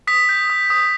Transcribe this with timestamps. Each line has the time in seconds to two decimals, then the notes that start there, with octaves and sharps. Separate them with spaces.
0.07 D#6 B6
0.29 G6
0.50 D#6
0.70 D#6